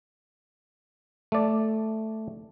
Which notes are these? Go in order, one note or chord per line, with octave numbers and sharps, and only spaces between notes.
A3 D5